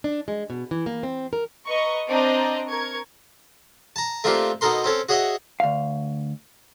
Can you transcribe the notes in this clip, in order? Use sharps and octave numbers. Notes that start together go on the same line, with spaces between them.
D4
G#3
B2
E3
A#3
C4
A#4
B4 D#5 A#5 C#6
C4 D4 D5 D#5 A#5
A#4 C#6 G#6
A5 A#5
A3 A#3 C4 D4 F4 G4
B2 D#4 A4 A#4 C6
C4 C#4 A4
F#4 G#4 C#5 D#5 E5 F#5
D2 F5